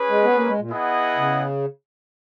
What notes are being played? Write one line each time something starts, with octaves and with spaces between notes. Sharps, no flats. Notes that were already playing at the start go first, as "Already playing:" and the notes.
Already playing: C#4 G#4 B4
G#3
B3
A#3
G#3
A#2
B3 E4 G#4 D#5 F#5
C#3